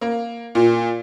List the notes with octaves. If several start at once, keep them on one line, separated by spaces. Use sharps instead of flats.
A#3
A#2